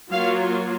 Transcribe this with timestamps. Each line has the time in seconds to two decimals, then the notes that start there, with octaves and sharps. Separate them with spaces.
0.11 F#3 A#3 F4 F5